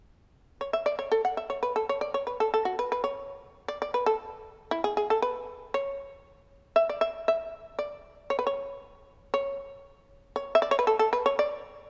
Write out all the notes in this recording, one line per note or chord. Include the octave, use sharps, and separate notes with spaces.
C#5
E5
D5
C#5
A4
F#5
E5
C#5
B4
A4
C#5
D5
C#5
B4
A4
A4
F#4
B4
B4
C#5
D5
D5
B4
A4
E4
G#4
G#4
A4
B4
C#5
E5
D5
E5
E5
D5
C#5
B4
C#5
C#5
C#5
E5
D5
C#5
B4
A4
A4
B4
C#5
D5